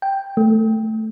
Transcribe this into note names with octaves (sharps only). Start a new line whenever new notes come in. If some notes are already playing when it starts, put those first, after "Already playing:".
G5
A3